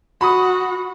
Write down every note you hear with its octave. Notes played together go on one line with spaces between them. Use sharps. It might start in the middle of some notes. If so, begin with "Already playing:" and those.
F#4 B5 D#6